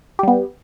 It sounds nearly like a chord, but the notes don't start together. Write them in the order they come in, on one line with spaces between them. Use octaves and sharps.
G4 G3 B3